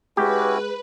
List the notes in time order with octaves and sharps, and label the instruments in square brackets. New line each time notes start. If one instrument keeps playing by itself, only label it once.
[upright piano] G#3 [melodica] C#4 E4 F#4 [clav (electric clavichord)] G4 [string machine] B4